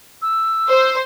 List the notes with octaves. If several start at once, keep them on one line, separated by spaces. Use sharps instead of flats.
E6
C5